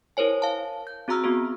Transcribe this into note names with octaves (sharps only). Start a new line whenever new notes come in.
E4 A#4 C5 C#5 G#5
F5 A5
G6
C4 F#4 G#4 A#5 E6 F6
B3 C4 F#4 G#4